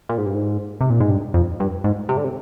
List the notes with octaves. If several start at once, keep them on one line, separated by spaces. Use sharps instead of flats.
A#2
G#2
G2
G#2
C3
A#2
G#2
G2
F2
G2
G#2
C3
D3
C3